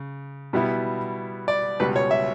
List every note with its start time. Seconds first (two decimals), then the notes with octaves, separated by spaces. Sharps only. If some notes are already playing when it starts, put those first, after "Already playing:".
Already playing: C#3
0.53 B2 G3 B3 E4
1.48 D5
1.80 C#2 B2 G3 B4
1.96 C#5
2.11 E5